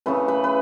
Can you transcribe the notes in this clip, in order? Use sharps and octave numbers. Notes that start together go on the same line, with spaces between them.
C#3 E3 A3 B4
B4
B4